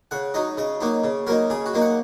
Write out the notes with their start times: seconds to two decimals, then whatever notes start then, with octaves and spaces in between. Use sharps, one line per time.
0.11 C#3 F#5
0.34 F#3 D#4 D#5
0.58 C#3 D#5
0.81 F#3 A#3 D#4
1.04 C#3
1.27 F#3 A#3 D#4 A#4
1.50 C#3 G#4
1.66 F#4
1.74 F#3 A#3 D#4
1.82 F#5